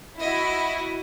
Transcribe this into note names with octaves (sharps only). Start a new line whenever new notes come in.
E4 F#4 D#5